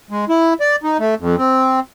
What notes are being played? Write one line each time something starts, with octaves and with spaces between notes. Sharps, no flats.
G#3
E4
D5
D#4
A3
F2
C4